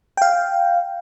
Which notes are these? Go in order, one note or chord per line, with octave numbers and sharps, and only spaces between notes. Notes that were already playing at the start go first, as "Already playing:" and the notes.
F5 G5